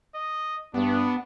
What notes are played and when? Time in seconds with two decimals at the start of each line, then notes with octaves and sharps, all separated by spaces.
0.15 D#5
0.74 G2 B3 D4